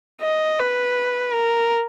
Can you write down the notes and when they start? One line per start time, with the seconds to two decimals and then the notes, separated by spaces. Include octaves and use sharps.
0.22 D#5
0.59 B4
1.34 A#4